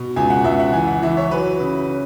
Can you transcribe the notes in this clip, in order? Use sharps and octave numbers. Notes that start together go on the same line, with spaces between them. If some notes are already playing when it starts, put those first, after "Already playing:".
Already playing: B2
C#2 G#5
F#5
C#2 E5
F#5
E3 G#5
F#5
E3 E5
C#5
F#3 B4
C#3
C#4